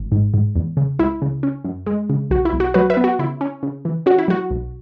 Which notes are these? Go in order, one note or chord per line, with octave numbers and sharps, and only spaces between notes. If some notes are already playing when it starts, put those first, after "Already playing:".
Already playing: G#1
G#2
G#2
E2
C#3
C#2 E4
C#3
C#4
F#2
G#3
C#3
B1 F#4
E4
B1
F#4
F#3 F#4 B4
B4 E5
B3
F#4
C#3 E4
C#4
C#3
E3
C#4 F#4
E4
F#3 F#4
B1